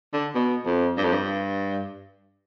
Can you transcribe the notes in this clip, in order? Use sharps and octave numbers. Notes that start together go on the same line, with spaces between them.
D3
B2
F2
G2
F2
G2